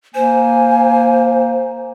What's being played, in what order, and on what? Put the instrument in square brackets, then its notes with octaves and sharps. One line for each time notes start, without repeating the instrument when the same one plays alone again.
[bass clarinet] A#3 [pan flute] C5 [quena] G#5